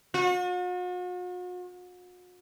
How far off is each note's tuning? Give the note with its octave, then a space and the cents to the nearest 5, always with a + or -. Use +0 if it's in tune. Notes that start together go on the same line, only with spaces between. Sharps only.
F#4 -45